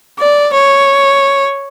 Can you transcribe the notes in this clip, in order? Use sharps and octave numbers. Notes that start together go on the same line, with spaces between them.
D5
C#5